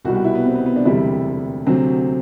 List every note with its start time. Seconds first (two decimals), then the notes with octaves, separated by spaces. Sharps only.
0.05 C2 B2 G3 F#4
0.15 F#4
0.24 E4
0.35 B3
0.45 C4
0.55 B3
0.66 B3
0.76 D4
0.85 E1 D2 C3 G3 E4
1.67 D2 C3 F#3 C4